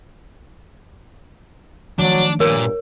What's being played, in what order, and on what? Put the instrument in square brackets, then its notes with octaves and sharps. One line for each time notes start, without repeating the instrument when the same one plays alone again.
[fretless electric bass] D#3 F3 A3 [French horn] F#3 [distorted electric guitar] D4
[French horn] G2 [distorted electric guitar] A#2 [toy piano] A#4 C#5